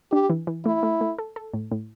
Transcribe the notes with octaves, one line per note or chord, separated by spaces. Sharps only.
D4 G4
E3
E3
A3 E4
A3
A3
A4
A4
A2
A2